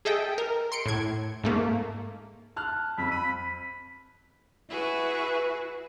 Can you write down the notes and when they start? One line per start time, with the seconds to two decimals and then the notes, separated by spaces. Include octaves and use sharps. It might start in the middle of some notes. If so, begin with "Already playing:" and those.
0.05 G#4 A4 D#5 E5 G5
0.38 A#4
0.72 C6 C#7 D7
0.86 A2 G#6
1.43 G#2 A3 A#3
2.56 A5 F6 F#6
2.98 F2 B5
3.11 B5 D#7
4.69 E4 F#4 G#4 B4